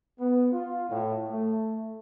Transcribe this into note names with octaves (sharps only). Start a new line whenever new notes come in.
B3
F4
A2
A3